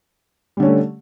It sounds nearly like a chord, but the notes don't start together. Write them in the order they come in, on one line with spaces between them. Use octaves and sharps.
G3 D3 C#4 A3